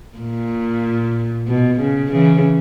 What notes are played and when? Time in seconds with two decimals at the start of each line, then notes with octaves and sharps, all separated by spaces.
0.18 A#2
1.48 B2
1.80 C#3
2.12 C#3 E3